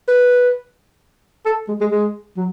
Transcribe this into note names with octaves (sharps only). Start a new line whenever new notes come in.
B4
A4
G#3
G#3
G#3
F#3